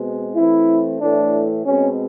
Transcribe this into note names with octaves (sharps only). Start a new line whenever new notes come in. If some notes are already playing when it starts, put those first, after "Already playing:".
Already playing: B2 G#3 C4
E3 A3 C4 E4
A2 E3 A3 D4
B2 G#3 C4 C#4